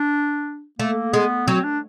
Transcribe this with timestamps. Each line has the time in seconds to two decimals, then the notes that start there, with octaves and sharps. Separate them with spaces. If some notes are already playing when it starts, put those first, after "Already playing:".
Already playing: D4
0.79 A3 A#3
1.13 G#3 B3
1.47 F#3 C4
1.64 D4